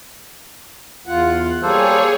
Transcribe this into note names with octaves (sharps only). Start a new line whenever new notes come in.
E2 F4 F#5
G3 A#3 G#4 A4 C5 C#5